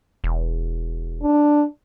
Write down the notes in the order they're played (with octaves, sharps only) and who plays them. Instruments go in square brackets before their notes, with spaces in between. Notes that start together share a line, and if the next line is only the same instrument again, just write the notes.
[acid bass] E1
[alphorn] D4